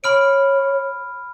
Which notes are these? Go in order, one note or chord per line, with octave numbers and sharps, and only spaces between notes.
C#5 B5 F6 D7